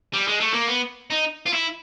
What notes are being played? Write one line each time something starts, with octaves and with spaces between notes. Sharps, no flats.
G3
G#3
A3
A#3
B3
D#4
F4
E4